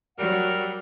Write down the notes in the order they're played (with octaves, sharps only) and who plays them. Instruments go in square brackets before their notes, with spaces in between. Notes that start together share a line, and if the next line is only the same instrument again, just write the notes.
[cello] F#3 [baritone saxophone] G3 [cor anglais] A#4 [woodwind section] F#5